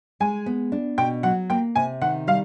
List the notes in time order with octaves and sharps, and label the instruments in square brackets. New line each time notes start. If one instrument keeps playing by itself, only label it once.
[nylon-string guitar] G#3 [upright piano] G#5
[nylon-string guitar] B3
D4
[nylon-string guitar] B2 [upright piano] G5
[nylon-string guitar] F#3 [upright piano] F#5
[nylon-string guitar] A#3 [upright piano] G5
[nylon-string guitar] C3 [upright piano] G#5
[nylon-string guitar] D#3 [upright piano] F#5
[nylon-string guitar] G3 [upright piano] F5